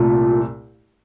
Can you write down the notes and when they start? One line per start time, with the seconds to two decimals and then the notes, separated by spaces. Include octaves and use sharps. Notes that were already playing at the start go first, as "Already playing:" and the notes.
Already playing: C2 A#2 A3 F4